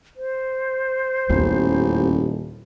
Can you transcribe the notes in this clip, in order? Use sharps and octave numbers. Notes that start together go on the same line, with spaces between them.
C5
D#1 A1 E2